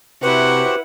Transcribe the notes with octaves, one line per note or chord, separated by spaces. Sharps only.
C3 E4 F#4 G4 B4 C5 F#5